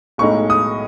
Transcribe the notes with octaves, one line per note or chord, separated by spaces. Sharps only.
B1 A2 G#3 D#4 C#6
D#6